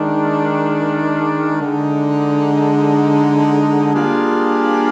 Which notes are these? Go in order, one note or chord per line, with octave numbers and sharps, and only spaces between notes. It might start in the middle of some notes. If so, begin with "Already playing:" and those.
Already playing: D#3 G#3 D4
D3 G#3 D#4
G3 A#3 D4 F4 G#4